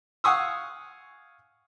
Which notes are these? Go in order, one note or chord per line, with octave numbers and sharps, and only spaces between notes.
F5 F#5 G#5 C#6 D#6 E6